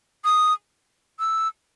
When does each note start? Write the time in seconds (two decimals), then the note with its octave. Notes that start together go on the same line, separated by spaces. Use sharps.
0.25 D#6
1.19 E6